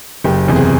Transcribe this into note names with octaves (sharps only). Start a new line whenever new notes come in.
F#1 G4
E2 C3
G#4